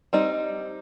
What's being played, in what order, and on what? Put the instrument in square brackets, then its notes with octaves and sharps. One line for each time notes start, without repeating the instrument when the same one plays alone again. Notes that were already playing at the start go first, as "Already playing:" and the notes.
[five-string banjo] G3 C4 D#4